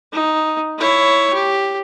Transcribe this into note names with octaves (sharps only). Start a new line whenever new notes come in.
D#4
E4 C#5
G4